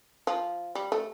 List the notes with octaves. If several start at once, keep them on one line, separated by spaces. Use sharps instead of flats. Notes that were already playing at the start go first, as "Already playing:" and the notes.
F3
G3
A3